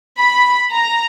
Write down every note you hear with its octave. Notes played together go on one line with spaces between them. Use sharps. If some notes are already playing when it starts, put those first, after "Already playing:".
B5
A#5